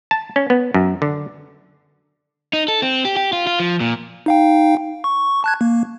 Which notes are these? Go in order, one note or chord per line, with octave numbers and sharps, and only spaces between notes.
A5
C#4
B3
F#2
D3
D#4
A4
C4
G4
G4
F4
F4
F3
A#2
D#4 F5 G5
C#6
A5 F#6 G#6
A#3